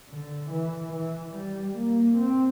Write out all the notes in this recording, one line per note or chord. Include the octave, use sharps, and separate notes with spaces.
D3
E3
E3
G3
A#3
C4